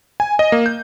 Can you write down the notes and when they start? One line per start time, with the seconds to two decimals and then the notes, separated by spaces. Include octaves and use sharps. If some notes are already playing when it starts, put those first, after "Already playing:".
0.20 G#5
0.39 D#5
0.52 A#3
0.66 G6